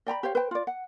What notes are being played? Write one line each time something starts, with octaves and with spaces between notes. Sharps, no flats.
D5 G5 A#5 B5
G4 C5 C#5 F5
B4 C5 G5
F4 D5
F#5